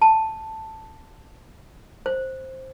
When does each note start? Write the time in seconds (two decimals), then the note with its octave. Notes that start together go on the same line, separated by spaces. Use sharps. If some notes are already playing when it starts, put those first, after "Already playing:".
0.02 A5
2.06 C5